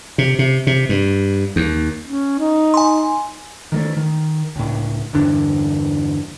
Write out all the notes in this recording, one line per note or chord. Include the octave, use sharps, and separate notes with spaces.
C3
C3
C3
G2
D#2
C#4
D#4
G#5 C6
D#3 G#3 A3
D#3
C#2 A2
E2 G2 D3 D4